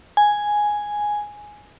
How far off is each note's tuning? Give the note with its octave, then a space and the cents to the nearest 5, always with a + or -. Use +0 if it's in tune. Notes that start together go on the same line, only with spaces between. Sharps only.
G#5 +0